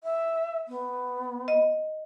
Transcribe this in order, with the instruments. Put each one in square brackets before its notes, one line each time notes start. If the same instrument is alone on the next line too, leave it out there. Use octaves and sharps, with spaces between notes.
[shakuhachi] E5
B3
[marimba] D#5